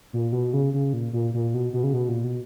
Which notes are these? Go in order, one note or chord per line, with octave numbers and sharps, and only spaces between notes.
A#2
B2
C#3
C#3
A#2
A#2
A#2
B2
B2
C#3
B2
A#2
B2